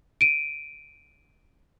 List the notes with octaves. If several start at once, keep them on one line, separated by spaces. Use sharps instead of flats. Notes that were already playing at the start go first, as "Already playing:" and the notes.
D7 D#7